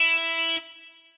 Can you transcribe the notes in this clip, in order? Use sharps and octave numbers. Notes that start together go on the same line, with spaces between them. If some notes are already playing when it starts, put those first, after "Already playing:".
Already playing: E4